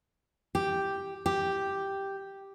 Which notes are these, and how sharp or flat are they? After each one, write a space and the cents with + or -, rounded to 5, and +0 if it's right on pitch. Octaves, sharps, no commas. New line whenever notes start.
G4 +0
G4 +0